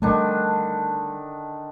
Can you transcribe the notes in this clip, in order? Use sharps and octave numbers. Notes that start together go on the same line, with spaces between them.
D3 D#3 G3 A3 D4